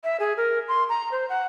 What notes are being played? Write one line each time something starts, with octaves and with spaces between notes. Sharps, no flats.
E5
G#4
A#4
C6
A#5
C5
F#5